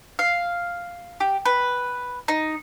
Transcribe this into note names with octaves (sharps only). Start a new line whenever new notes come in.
F5
G4
B4
D#4